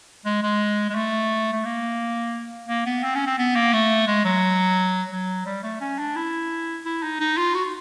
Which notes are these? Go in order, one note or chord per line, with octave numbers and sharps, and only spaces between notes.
G#3
G#3
G#3
A3
A3
A#3
A#3
B3
C4
C#4
C4
B3
A#3
A3
G#3
F#3
F#3
G3
A3
C#4
D4
E4
E4
D#4
D#4
F4
F#4